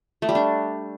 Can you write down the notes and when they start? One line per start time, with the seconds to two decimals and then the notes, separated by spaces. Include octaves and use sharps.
0.22 A3
0.29 G3
0.35 D4